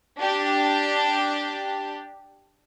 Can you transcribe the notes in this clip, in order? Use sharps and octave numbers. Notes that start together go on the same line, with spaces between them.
D4 G4